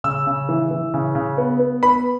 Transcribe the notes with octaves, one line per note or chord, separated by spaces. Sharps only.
C#3 E6
C#3
E3
E3
C#3
C#3
B3
B3
B3 B5